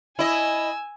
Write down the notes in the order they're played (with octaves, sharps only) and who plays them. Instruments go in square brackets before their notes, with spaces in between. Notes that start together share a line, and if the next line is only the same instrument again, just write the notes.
[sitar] E4 D#5 [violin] G#5 E6